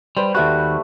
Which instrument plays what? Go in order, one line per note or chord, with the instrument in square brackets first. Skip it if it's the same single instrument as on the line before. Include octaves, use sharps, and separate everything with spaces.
[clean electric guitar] G3 [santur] B4 C5
[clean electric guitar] D#2 F#4 [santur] G3 A3